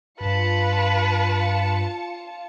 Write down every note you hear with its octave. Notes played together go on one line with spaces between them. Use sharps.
G2 F4 B4 A5 C#7